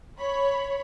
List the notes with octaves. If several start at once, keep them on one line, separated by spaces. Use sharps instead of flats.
C#5 B5